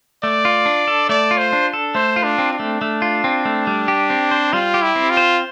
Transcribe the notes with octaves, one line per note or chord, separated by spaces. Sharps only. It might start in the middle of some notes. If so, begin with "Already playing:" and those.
A3 D5
F4
D4
A4
A3 D5
F4
C5
D4
A4
A3 C5
F4
D4
C4
D4
A3
A3
F4
C4
A3
G3
G4
C4
C5
G3 F4
G4
E4
C4
F4
C5